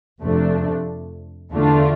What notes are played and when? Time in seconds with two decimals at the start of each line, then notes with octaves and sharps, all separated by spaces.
0.22 F2 C3 F3 A3 D4
1.52 E2 D3 A3 D4 F4